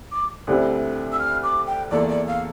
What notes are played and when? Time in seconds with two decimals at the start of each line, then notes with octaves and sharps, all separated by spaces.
0.12 D6
0.47 D2 D3 G3 C4 E4
1.12 E6
1.19 F6
1.43 D6
1.66 G5
1.91 E2 E3 A#3 F4 A4 D5
2.09 D5
2.27 F5